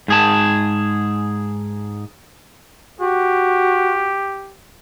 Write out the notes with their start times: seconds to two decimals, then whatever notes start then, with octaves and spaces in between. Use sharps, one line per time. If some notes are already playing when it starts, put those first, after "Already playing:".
0.08 G#2 G#4 A5
3.01 F#4 G4